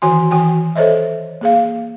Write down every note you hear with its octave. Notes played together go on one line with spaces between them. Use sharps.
D#3 E3 F#4 G#5 C6
E3 F#4 G5 G#5
A4 C5 C#5 D#5 E5
A#3 G#4 F5